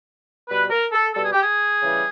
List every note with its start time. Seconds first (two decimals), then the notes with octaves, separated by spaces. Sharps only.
0.48 B2 G3 B4
0.70 A#4
0.92 A4
1.14 B2 G3 A4
1.23 G#4
1.33 G4
1.42 G#4
1.80 C#3 E3 G3